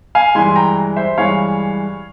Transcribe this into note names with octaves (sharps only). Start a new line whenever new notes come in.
F5 G#5
G2 E3 G#3 G#5 C6
G5 A#5
C5 E5
G2 E3 G#3 C#5 F5